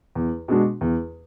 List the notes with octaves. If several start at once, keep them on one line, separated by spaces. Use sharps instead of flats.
E2
B2 G#3 D4 F#4
E2